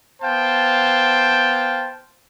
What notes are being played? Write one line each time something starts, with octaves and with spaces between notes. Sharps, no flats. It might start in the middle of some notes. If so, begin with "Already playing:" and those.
B3 C5 F5 G5 A5